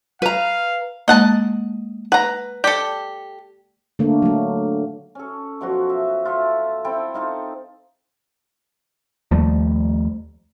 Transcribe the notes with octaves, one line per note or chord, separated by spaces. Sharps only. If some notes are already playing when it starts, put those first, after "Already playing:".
B4 F5 A#5
G#3 A#3 D#5 F#5 A5
B4 F#5 A#5
G4 A4 D5
D3 A3 A#3
F#3 A3
C#4 A4
B2 F3 F#3 F#4
E5
F4 A4 E5
C4 E4 A4 G5
D#4 F4 A4
D#2 F3 G3 A3